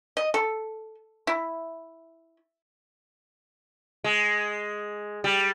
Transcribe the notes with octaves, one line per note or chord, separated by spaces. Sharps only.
D#5
A4
E4
G#3
G3